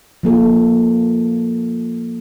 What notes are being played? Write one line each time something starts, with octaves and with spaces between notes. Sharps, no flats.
F3 A#3 F4 A4